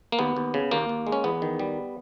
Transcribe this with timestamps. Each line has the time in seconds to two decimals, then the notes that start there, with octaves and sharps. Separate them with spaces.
0.12 A#3
0.19 D#2 B3
0.37 D#2
0.54 C#3
0.71 D#2 A#3
0.89 D#2
1.07 G#3
1.12 C#4
1.24 E2 B3
1.42 D#3
1.59 G3